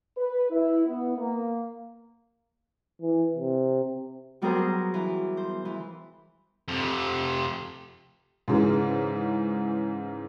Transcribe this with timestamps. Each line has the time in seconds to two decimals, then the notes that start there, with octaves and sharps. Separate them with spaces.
0.17 B4
0.50 E4
0.86 B3
1.17 A#3
3.01 E3
3.37 C3
4.42 F#3 G3 B3 G#4 A#4 C5
4.94 E3
5.37 C5
5.65 E3
6.68 F2 C3
8.48 G#2 C#3 E3